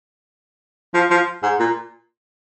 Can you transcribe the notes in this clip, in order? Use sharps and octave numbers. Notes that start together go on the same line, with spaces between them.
F3
F3
G#2
A#2